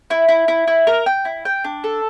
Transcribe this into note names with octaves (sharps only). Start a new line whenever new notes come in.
E4
E4
E4
E4
A#4
G5
E4
G5
D4
A4